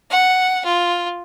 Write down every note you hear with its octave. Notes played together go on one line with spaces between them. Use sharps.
F#5
F4